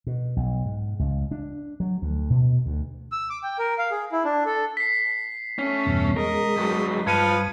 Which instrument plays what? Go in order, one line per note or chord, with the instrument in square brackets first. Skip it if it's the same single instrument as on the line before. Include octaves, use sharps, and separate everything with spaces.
[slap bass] B2
B1
G#2
C#2
D4
F#3
D2
B2
D2
[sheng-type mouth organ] E6
D6
G5
A#4
F5
G#4
E4
D4
A4
[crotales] B6 C7
[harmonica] A3 [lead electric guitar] C#4 [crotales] B6
[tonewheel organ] E2 G2 B2
[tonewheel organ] G#3 [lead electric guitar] A#4 [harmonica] D#5
[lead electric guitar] G2 F#3
[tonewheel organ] G2 [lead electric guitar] F4 A5 [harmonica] B4 F5 [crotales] G#6 C#7 D#7